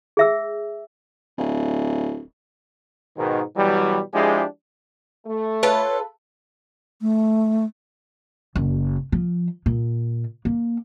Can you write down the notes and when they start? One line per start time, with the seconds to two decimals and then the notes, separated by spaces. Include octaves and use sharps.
0.17 G#4 E5 E6
1.38 D1
3.18 G#2 B2 D#3
3.57 B2 E3 F#3 G3
4.14 F3 G#3 D4 E4 G4 G#4
5.26 A3
5.63 F4 A4 B4 C#5
7.01 A3
8.55 F#1
9.12 F3
9.66 A#2
10.45 A#3